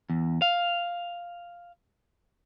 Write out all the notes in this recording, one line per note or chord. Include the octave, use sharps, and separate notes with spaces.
E2
F5